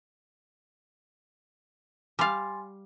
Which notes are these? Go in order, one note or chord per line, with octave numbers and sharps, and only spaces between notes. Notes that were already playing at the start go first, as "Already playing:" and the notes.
G3 F5 G#5 C6 A6